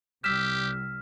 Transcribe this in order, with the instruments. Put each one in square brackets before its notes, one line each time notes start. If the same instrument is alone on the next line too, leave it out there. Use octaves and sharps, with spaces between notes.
[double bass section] C2 G3 [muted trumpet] G4 [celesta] E6 B6 E7 [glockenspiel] F6